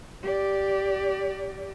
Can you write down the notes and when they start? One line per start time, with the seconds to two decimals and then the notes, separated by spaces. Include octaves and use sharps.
0.23 G4 D5